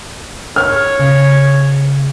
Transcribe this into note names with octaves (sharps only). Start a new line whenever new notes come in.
C#5 F6
C#3